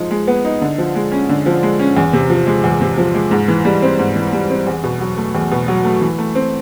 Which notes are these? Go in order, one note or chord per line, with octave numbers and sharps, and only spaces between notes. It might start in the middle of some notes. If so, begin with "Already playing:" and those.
Already playing: F3 G#3 D#4
G#3
B3
D#4
D3
F3
G#3
C#4
D3
F3
G#3
C#4
E2
C3
F3
G#3
E2
C3
F3
G#3
G#2
E3
G3
C4
G#2
E3
G3
C4
E2
B2
F#3
A3
E2
B2
F#3
A3
E3
A3
C4